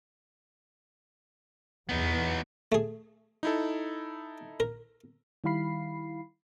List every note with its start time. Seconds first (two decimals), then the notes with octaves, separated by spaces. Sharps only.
1.89 E2 B3 D#4
2.72 A3 G#4
3.43 D#4 E4 A4
4.60 A#4
5.44 D#3 G3 E4 F5 B5 C7